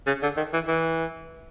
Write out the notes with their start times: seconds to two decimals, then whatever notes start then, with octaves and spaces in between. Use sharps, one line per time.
0.07 C#3
0.23 D3
0.37 D#3
0.54 E3
0.68 E3